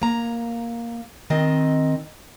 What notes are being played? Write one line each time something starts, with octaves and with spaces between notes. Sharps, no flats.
A#3 A#5
D#3 C4 D#5